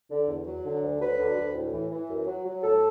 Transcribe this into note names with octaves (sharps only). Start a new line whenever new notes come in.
D3
E2
F#3
D3
D2
F#3 B4
D3
D2
A2
E3
E3
F#2
F#3
F#3
A2 A4